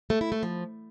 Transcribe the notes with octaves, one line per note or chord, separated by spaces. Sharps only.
A3
E4
A3
F3